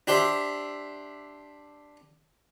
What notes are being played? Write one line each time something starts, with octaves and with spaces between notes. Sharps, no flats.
D4 G4 C5 E5